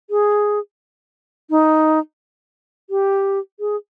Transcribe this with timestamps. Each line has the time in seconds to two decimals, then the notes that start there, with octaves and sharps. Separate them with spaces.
0.10 G#4
1.50 D#4
2.90 G4
3.60 G#4